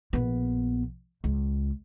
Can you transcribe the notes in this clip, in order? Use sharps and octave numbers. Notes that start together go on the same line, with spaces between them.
A#1 B3
C#2